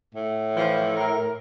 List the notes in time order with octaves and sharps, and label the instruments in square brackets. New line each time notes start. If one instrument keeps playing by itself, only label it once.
[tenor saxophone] A2
[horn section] E3 F3
A#4